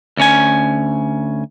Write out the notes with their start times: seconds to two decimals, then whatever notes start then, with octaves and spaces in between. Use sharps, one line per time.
0.17 D2 C#4 G#5